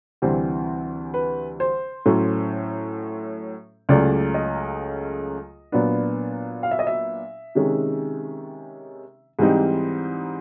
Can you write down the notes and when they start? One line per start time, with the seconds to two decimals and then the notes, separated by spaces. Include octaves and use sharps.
0.22 D2 C3 E3 G3 C4 C5
1.14 B4
1.60 C5
2.06 A2 F#3 A3 C#4
3.89 C#2 C#3 F#3 A3 D5
4.34 D#5
5.72 A#2 F#3 B3 D4
6.63 F5
6.71 E5
6.79 D#5
6.87 E5
7.55 C3 D#3 G#3 C#4
9.39 G#2 E3 G3 C4 D#4